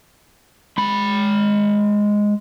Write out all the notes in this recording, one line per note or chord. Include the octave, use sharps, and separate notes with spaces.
G#3 B5